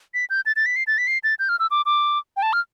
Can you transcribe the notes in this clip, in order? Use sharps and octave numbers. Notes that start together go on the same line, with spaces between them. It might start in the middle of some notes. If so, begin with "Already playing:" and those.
B6
G6
A6
A6
B6
C7
A6
B6
C7
A6
G6
F6
E6
D6
D6
G5
A5
F6